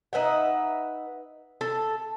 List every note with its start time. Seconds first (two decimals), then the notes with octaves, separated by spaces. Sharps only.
0.13 D#4 B4 E5 F#5
1.61 A4